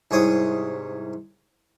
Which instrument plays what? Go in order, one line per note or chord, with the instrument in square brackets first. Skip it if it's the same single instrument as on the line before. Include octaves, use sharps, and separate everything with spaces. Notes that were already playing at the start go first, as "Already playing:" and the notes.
[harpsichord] C2 G#2 G#4 C#5 D#6